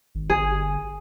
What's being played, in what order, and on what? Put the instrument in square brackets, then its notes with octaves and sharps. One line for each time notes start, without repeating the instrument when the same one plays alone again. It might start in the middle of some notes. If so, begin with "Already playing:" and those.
[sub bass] G#1
[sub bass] G1 [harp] G#4